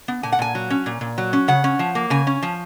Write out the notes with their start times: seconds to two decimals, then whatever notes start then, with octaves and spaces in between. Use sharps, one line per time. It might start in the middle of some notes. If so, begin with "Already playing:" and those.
0.08 B3
0.23 A#2 G#5
0.32 F#5
0.39 A#2 G#5
0.55 F#3
0.70 C#4
0.86 A#2
1.01 A#2
1.18 F#3
1.33 C#4
1.48 C#3 F#5
1.64 C#4
1.79 F3
1.95 A#3
2.10 C#3 G#5
2.27 C#4
2.42 F3